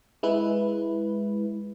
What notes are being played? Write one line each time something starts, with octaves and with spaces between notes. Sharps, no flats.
G#3 E4 B4